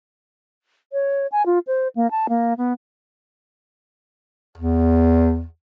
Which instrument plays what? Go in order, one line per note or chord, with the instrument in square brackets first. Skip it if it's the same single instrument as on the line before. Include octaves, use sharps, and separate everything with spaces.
[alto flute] C#5
G#5
F4
C5
A#3
A5
A#3
B3
[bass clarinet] E2